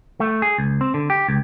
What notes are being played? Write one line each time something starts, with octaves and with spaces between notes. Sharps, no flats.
A3
G#4
C#2
C4
D3
G4
C#2